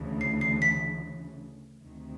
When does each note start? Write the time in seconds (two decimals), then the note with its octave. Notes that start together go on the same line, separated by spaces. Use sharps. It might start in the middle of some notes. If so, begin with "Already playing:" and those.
Already playing: D2 C#3 E3
0.21 C7
0.41 C7
0.62 B6
1.84 D2 C3 D#3